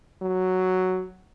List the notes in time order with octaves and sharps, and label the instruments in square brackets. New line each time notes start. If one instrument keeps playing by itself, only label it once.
[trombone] F#3